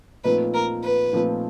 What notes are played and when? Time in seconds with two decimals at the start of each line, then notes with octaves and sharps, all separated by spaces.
0.24 A#2 F3 A3 C4 D#4 B4
0.54 A#4
0.84 B4
1.13 A#2 F3 A3 C4 D#4